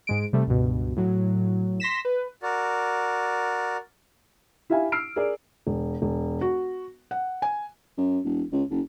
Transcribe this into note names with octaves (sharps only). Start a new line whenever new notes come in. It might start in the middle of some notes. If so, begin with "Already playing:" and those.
G#2 G#3 D7
C3 G3 A3
C#2 G2 B2
A2 F#3
C6 A#6 B6 E7
B4
F#4 A#4 D5
E4 G4 E5 F5 G#5
E6 F6 C7 D7
G#4 A#4 D5
E1
E1
F#4
F#5
G#5
F#2
E1
C#2
F#1